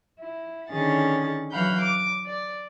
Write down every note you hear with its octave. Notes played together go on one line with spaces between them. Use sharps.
E4
D3 D#3 C#4 G#4 F#5 A6
E3 F#3 F5 F#5 B5 G6
D6
D5